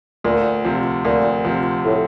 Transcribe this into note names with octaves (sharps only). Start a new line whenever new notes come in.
D2 A#2
C3 F3
D2 A#2
C3 F3
A2